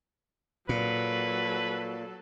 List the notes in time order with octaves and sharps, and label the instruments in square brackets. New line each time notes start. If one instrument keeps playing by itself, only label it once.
[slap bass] A#2 [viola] F#3 A4 [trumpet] B4